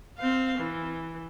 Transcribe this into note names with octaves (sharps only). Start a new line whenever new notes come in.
C4 F5
E3